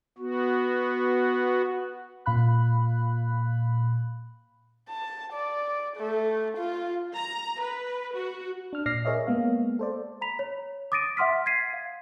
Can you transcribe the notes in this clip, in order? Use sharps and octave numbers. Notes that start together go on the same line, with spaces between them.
B3 F#4
A#2 F5 B5 F#6
A5
D5
A3
F4
A#5
B4
F#4
D4 F6
A#2 D5 F6 A#6 C7
G#4 A#4 C#5 D#5 E5
G#3 A#3 B3 F5
A4 C5 D5
A#5 B5 B6 F7
C#5
D6 D#6 A6 A#6 D7 D#7
E5 F#5 C6 F6 B6
G#6 A6 B6 C7 D#7
F5